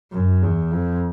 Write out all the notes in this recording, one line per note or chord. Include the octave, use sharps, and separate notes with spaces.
F#2
E2
F2